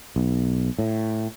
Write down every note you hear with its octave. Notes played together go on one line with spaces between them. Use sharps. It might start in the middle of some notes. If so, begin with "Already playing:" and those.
B1
A2